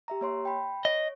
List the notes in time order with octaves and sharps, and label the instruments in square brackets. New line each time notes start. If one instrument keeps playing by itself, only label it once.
[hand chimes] G4 E5 A#5
A#3 C#5 C6
G5 B5
[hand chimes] C#5 [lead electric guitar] D#5